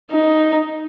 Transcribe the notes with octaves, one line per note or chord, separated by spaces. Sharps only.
D#4